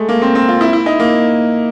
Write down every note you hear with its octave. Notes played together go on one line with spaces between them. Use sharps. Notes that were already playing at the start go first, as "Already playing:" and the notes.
Already playing: G#3 A3
A#3
C4
C4
F4
E4
E4
D#4
A#3